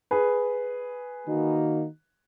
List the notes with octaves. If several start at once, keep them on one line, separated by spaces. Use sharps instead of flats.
G#4 B4
D#3 A#3 D#4 F#4